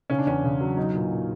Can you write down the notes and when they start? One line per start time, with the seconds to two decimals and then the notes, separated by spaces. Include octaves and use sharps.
0.10 C#3 C#4
0.19 D4
0.27 E2 C#4
0.44 C#3
0.61 F#3
0.77 B1 D#4
0.94 A#2
1.11 A#2